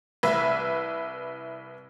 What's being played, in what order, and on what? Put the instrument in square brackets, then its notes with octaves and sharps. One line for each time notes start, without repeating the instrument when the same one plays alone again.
[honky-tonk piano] C2 B4 E5